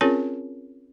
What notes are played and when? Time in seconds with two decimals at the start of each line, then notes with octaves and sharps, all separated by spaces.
0.01 C4 C#4 F4 G#4 A#4 C#5